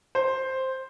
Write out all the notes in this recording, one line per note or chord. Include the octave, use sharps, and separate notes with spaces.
C5